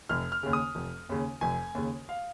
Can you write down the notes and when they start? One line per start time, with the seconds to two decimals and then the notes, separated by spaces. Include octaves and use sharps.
0.09 F1 F6
0.32 F6
0.43 D#2 C#3
0.53 D#6
0.75 F1
1.09 D#2 C#3
1.41 F1 G#5
1.75 D#2 C#3
2.09 F5